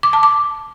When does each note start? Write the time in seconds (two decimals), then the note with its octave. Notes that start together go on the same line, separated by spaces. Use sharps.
0.03 D6
0.13 A5
0.23 D6